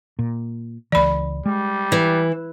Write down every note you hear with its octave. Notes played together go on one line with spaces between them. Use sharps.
A#2
C#2 E3 D5 B5
G3 G#3
E3